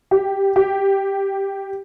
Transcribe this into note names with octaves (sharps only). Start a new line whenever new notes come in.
G4
G4